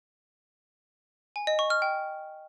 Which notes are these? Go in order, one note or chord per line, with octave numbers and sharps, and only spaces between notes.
G#5
D#5
C#6
F6
G5